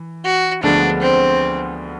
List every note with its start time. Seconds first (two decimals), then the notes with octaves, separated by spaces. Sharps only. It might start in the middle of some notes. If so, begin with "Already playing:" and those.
Already playing: E3
0.25 F#4
0.63 D2 D3 F3 G#3 B3 D4
1.02 C4